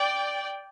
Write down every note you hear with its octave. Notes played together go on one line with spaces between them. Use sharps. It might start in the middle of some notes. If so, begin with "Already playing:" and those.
Already playing: D5 G5